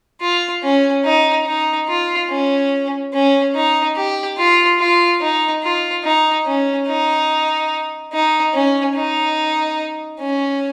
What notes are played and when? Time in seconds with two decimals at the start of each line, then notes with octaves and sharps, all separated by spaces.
0.21 F4
0.63 C#4
1.05 D#4
1.46 D#4
1.88 F4
2.30 C#4
3.13 C#4
3.55 D#4
3.96 G4
4.38 F4
4.79 F4
5.21 D#4
5.63 F4
6.04 D#4
6.46 C#4
6.87 D#4
8.12 D#4
8.54 C#4
8.95 D#4
10.20 C#4